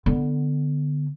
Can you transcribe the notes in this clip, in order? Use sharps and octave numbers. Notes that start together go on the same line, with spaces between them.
D3 B3